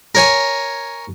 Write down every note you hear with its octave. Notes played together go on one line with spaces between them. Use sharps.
A#4 C#5 G#5